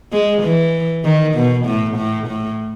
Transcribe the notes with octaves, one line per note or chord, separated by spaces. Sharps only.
G#3
E3
D#3
B2
A2
A2
A2